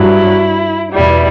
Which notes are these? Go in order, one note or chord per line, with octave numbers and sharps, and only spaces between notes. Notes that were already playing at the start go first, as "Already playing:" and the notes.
Already playing: G2 F#3 E4
E2 B2 G3 E4